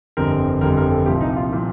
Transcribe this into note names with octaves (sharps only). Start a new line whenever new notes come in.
G1 F2 D3 G3 C4 A#4
G1 F2 D3 G3 C4 A#4
A#4
A4
C2 A#2 F3 C4 G4
D#4
F4
A#2 F3 C4